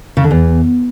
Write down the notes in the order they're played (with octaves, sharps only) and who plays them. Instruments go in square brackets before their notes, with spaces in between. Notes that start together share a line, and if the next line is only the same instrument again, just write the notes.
[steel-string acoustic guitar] C#3
D3
E2